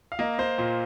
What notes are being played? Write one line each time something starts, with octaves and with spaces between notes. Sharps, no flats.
F5
A#3 D#5
A#3 C5
A#2